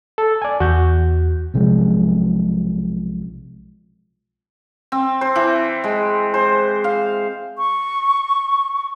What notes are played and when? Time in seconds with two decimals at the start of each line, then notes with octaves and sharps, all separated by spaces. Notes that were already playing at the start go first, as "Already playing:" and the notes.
0.18 A4
0.42 D5 G#5
0.60 E2 F#4 G6
1.54 B1 C3 F3 G#3
4.92 C4
5.21 C5
5.36 E3
5.84 G#3
6.34 C5
6.84 F5
7.58 C#6